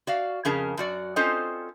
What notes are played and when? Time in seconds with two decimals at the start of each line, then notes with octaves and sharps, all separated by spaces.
0.07 F#4 D5 F5
0.45 F2 C#3 C#4 G#4 A#4 A5
0.77 F#2 F#4 D5
1.16 C4 C#4 F4 A4 C5 D#5